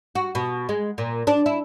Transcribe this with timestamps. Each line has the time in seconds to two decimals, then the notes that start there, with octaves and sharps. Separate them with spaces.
0.15 F#4
0.35 B2
0.69 G#3
0.98 A#2
1.27 D4
1.46 E4